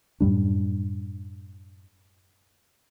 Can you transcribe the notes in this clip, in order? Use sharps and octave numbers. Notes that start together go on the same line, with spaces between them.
F#2 A2 G3 D4